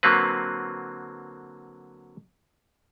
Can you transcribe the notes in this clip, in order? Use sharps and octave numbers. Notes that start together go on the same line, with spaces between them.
D3 F#3 A#3 C4 B4